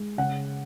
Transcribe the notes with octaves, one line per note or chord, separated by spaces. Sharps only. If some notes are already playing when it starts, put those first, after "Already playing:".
Already playing: G#3
C#3 F#5